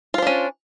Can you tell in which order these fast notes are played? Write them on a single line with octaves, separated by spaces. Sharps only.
F4 C5 D4 C#4